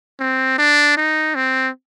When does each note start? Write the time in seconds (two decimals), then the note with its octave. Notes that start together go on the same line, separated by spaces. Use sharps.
0.20 C4
0.59 D4
0.97 D#4
1.35 C4